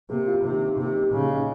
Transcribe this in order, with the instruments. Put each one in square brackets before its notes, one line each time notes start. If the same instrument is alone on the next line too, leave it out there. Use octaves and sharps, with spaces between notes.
[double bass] C3 [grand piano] A#3
[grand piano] F4
[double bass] C3 [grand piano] D#3
[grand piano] D#3
[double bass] C3 [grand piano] A#3
[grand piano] D#4
[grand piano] A#2 [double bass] C#3
[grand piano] D#4